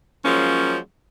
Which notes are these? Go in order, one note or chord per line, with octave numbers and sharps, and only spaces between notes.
F3 F#3 G#3 A#3 C#4